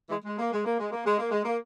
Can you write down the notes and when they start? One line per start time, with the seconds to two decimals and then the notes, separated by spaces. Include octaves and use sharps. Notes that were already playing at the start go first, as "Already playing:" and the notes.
0.09 E3 G#3
0.25 G#3
0.38 A#3
0.51 G#3
0.65 A#3
0.79 G#3
0.91 A#3
1.04 G#3
1.18 A#3
1.31 G#3
1.44 A#3